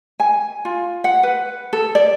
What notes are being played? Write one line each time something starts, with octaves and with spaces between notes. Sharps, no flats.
G#5
F4
F#5
B4
A4
D5